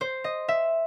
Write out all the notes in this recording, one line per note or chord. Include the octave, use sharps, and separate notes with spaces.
C5
D#5
E5